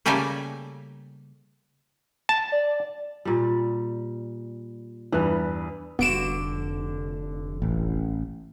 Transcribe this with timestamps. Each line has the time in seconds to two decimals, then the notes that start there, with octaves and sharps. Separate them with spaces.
0.06 C#3 G3 A3 A#3 G4 G#5
2.29 A5
2.52 D5
3.25 A#2 G3
5.13 E2 G2 E3 G3 B4
5.99 F1 D3 B3 F#4 D7 E7
7.62 A1